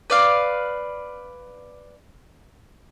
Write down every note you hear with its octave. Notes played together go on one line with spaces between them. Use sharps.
B4 D5 F5